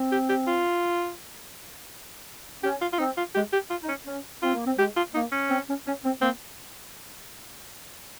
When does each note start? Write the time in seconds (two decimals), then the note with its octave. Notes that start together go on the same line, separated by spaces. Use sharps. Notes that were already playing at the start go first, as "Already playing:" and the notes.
Already playing: C4
0.12 G4
0.29 G4
0.47 F4
2.63 C#4 G4
2.81 F4
2.93 F4
2.98 C4 D#4
3.17 F4
3.35 G#3 G4
3.53 G4
3.70 F4
3.83 D#4
3.88 C#4
4.06 C#4
4.42 C4 F4
4.54 A#3
4.66 C4
4.78 G#3 G4
4.96 F4
5.14 A#3 D#4
5.32 C#4
5.50 C4
5.68 C#4
5.86 C#4
6.04 C4
6.21 A#3 C4